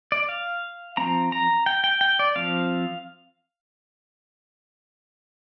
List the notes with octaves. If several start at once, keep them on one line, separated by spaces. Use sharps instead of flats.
D5
F5
F3 C4 A#5
A#5
G5
G5
G5
D5
F3 C4 F5